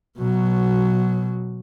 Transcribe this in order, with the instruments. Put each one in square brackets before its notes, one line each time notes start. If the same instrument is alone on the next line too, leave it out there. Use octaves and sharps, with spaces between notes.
[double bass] B2 F#3